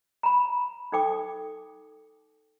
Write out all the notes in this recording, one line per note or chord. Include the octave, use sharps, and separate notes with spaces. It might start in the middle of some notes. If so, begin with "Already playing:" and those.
A#5 B5
D#4 A4 G5 D6 D#6